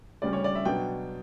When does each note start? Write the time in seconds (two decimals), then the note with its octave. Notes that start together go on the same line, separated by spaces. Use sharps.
0.22 D2 C#3 G3 D5
0.33 C#5
0.44 D5
0.55 E5
0.65 B2 F#3 B3 D4 G5